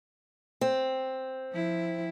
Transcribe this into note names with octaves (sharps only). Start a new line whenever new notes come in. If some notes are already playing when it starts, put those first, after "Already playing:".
C4
F3 E4